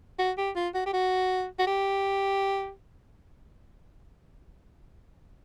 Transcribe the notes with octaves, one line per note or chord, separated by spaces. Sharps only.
F#4
G4
F4
F#4
G4
F#4
F#4
G4